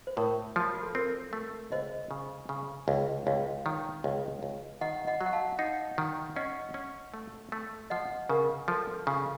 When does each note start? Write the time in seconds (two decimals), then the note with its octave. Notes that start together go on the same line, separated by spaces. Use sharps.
0.07 C5
0.17 A2 A#4 C#5
0.56 F3
0.62 F4
0.73 F#4
0.83 A4
0.94 C4 A#4
1.33 A3
1.72 C#2 C5 D#5
2.11 C#3
2.49 C#3
2.88 C#2
3.26 C#2 C#5 F5
3.66 D#3
4.04 C#2
4.43 C#2
4.81 D#3 D#5 F#5
5.07 D#5 F#5
5.21 F#3
5.26 F#5
5.33 F5 A5
5.59 D#4 D#5 F#5
5.98 D#3
6.36 C#4 D#5 F#5
6.74 C#4
7.14 A3
7.52 A3
7.90 F3 D#5 F#5
8.29 C#3 A#4
8.68 F3 A4
9.07 C#3